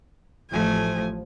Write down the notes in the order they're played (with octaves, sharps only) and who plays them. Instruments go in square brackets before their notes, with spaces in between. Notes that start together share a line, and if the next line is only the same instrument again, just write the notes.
[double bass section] A1 A2 F3 [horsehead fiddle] A3 G#5